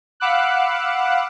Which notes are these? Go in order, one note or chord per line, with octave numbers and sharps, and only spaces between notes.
F5 F#5 B5 D6 E6 F#6